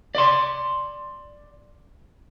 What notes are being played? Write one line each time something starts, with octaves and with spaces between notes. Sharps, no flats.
D5 C6